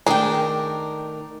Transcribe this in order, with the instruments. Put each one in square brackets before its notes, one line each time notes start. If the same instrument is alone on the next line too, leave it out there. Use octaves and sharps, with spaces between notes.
[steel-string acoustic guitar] D#3 A3 A#4 [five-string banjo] D4 [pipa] G#4 G5